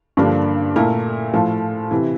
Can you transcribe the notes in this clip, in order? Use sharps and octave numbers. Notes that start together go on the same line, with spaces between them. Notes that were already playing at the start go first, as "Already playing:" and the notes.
G2 D3 F3 A#3 D4
A#2 A3 E4 A#4
A2 F3 A3
C3 E3